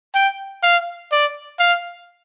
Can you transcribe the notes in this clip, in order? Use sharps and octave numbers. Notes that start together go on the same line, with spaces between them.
G5
F5
D5
F5